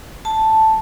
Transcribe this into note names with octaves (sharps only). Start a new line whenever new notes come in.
A5